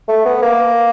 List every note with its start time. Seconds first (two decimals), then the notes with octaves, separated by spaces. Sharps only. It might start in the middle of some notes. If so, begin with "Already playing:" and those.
0.08 A3
0.25 B3
0.42 A#3